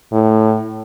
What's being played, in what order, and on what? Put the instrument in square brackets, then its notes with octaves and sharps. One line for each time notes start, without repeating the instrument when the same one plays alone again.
[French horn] A2